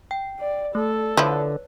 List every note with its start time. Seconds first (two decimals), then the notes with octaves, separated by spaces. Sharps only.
0.11 G5
0.39 D5
0.75 A3 A4
1.17 D3 F3 E4 B4 C#5